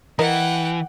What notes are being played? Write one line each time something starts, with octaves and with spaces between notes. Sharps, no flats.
E3 A#4 D#5 F#5 G5